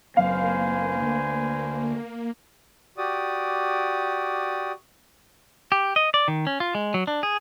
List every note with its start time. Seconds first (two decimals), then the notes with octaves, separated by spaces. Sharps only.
0.17 F#1 F#3 A#3 C4 B4 C5 F5 G#5
1.02 D2 D3
2.98 F#4 G4 D5 D#6
5.72 G4
5.96 D#5
6.14 D5
6.28 D#3
6.47 C#4
6.60 F4
6.75 G#3
6.94 F#3
7.07 D4
7.23 G#4